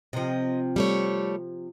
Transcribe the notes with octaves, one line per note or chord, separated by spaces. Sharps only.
C3 F3 D#5
G3 A3 C#5